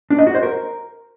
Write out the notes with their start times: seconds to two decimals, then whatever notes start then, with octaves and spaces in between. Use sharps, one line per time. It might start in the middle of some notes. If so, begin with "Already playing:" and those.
0.10 D4
0.19 D#5
0.27 F#4
0.35 C5
0.43 A#4